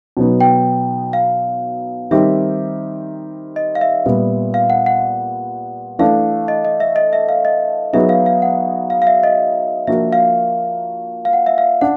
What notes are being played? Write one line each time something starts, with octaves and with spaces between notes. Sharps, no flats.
B2 F#3 B3 D#4
G5
F5
D#3 G3 C4 D#4 G4 E5
D#5
F5
E5
A#2 G3 B3
F5
F#5
F#5
E3 A3 D4 F5
D#5
D#5
E5
D#5
E5
F5
D#5
F#3 B3 D#4 G#4 E5
F5
F5
F#5
F5
F5
E5
D#5
F3 A#3 D4 F#4 A#4 E5
F5
F5
F#5
E5
F5
D4 F#5